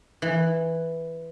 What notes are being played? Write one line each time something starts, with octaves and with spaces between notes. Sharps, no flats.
E3